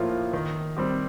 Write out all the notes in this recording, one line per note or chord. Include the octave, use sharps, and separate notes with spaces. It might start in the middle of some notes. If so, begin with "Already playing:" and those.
Already playing: A2 F3 A#3 F4
D#3
G3 C4 G4